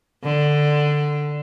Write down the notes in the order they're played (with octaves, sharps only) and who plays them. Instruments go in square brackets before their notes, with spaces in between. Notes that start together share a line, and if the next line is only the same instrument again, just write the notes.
[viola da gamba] D3